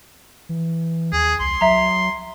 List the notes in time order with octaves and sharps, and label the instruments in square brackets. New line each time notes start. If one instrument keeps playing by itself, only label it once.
[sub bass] E3
[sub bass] D#2 [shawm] G#4
[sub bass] C2 [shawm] C6
[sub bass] F#3 [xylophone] E5 A#5